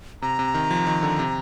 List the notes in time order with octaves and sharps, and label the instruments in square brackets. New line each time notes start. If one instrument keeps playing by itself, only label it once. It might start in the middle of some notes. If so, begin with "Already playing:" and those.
[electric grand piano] C3 [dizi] A#5
[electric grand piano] C3
D#3
F3
D#3
D3
C3